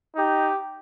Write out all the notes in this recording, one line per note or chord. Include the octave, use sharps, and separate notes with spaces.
D#4 G4